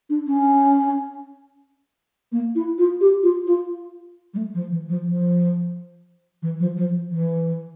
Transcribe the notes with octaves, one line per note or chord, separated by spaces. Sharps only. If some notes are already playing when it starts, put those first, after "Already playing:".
D4
C#4
A#3
E4
F4
G4
F4
F4
G3
A3
F3
E3
F3
F3
E3
F3
F3
E3